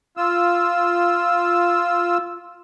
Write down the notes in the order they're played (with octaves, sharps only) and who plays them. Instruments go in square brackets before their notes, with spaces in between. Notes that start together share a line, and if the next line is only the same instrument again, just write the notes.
[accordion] F4 E6